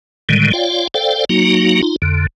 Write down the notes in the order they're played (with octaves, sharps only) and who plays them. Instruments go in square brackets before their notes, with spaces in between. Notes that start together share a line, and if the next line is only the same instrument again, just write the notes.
[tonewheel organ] A2 D3 D#3 G3 G#3
F4 C#5 D5 F5 G5
A4 C5 D5 F5 G5
F#3 A#3 D#4 F#4
D#4 F4
F2 D3